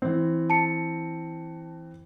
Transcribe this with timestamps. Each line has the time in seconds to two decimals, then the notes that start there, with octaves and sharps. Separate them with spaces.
0.02 E3 C4
0.50 A5 C#7